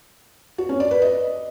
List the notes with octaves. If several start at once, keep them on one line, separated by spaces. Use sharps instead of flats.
F#4
C#4
D5
B4
D#5